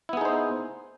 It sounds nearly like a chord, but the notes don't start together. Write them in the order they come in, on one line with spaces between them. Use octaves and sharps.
E4 B3 G#4 D#4 C5